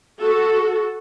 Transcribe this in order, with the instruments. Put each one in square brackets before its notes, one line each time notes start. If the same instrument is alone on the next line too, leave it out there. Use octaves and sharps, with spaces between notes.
[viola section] F#4 A4